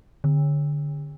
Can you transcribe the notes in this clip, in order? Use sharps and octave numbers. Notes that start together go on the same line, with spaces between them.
D3